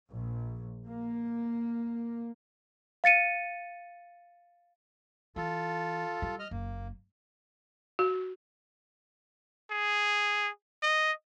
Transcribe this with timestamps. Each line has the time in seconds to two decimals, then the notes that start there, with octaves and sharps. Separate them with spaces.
0.11 A#1
0.87 A#3
3.04 F5 A6 C#7 D#7
5.36 E3 F4 A4
6.22 G3
6.39 D#5 F6
6.51 F#1 A#3
7.99 F#4
9.71 G#4
10.83 D#5